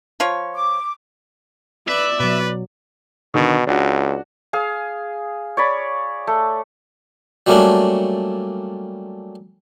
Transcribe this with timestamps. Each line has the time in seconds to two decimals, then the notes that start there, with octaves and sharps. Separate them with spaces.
0.20 F3 F4 C#5
0.54 D6
1.88 B4 D5 E5
2.20 B2 F#3 B4
3.34 B2 D3 D#3
3.67 C#2 D4 F#4
4.53 G#4 F5
5.57 C#5 D5 B5
6.27 A3
7.46 F#3 G3 A3 A#3 C#4 D4